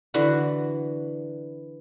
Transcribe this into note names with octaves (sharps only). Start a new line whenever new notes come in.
D3 E3 F#4 B5